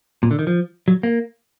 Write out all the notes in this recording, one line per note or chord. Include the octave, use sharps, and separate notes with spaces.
A#2
D3
D#3
F3
F#3
A#3